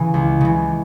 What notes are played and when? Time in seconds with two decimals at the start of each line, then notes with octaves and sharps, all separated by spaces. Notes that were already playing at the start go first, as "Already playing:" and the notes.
Already playing: C#3 E3
0.14 C#2
0.41 C#3 E3